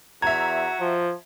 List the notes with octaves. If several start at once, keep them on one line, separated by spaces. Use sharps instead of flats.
E2 F#4 E5 A#5 G#6
F3